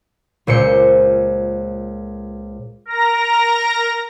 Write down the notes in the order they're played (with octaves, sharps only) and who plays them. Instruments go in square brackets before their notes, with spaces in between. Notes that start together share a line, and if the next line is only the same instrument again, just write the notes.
[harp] C#2 A#2 C5 C#7
[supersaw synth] A#4 A#5 A#6